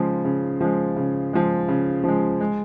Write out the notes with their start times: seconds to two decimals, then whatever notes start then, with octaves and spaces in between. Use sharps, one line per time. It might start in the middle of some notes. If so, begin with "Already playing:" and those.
Already playing: C#3 F3 G#3
0.25 C#3
0.61 F3 G#3
0.96 C#3
1.33 F3 G#3
1.68 C#3
2.04 F3 G#3
2.41 G#3